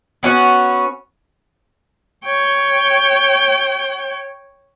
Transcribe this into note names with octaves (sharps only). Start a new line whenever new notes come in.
B3 C#4 F#4
C#5 G5